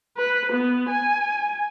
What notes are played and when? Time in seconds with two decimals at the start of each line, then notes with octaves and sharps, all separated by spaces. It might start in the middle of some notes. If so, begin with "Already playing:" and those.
0.17 B4
0.53 B3
0.89 G#5